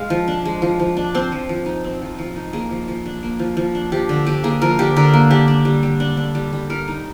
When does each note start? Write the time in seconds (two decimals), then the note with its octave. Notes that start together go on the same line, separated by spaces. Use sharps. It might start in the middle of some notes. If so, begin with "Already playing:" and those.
Already playing: G#3 F5
0.10 F3
0.28 D4
0.45 G#3
0.62 F3
0.80 F3
0.97 D4
1.15 C4 C5
1.32 F3
1.49 F3
1.66 D#4
1.84 C4
2.02 F3
2.19 F3
2.36 D#4
2.53 A#3 G#4
2.71 F3
2.88 F3
3.06 D4
3.23 A#3
3.39 F3
3.57 F3
3.75 D4
3.92 F3 G4
4.09 D3
4.27 D3 G4
4.44 A#3 G#4
4.62 F3 A#4
4.79 D3 G4
4.96 D3 A#4
5.14 A#3
5.31 D4 G4
5.48 D4
5.65 G3
5.83 G3
6.00 D4
6.17 D4
6.35 G3
6.53 G3
6.70 G3 A#4
6.88 D#4